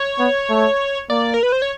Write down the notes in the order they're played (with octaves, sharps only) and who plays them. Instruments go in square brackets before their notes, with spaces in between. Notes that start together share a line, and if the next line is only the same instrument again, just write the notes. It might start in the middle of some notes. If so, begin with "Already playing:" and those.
Already playing: [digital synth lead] C#5
[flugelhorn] B3
A3
[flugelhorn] A#3 [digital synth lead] D5
[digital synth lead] A#4
B4
C5
C#5